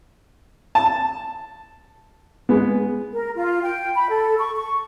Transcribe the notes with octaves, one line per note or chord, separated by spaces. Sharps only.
A5
G#3 B3
A#4
F4
G5
B5
A4
C#6
C#6